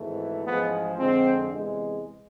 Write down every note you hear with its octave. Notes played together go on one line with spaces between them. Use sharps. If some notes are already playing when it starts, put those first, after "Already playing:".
Already playing: G#1 G#2 E3 A3
A1 G#2 F3 G#3 B3
F2 D3 G#3 C4
E2 C3 G#3